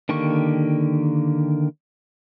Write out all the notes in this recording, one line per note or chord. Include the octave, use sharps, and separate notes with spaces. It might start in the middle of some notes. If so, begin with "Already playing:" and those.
D3 D#3 A#3 G4 C#6